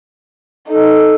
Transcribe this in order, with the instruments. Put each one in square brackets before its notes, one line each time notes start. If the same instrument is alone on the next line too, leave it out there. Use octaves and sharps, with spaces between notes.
[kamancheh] D#4 [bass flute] A4